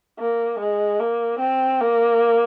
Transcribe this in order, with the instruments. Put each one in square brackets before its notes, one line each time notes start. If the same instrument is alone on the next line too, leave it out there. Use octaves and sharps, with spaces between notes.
[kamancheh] A#3
G#3
A#3
C4
A#3